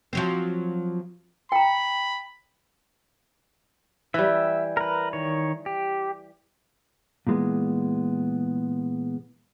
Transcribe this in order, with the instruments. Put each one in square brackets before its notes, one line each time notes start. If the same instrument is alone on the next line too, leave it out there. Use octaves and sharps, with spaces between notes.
[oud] F3 F#3 C4
[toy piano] G5 A#5 [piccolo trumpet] B5
[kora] E3 G3 [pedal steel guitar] E5
[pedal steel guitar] A#4 B4
D#3 C#5
G4
[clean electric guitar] A#2 E3 G#3 B3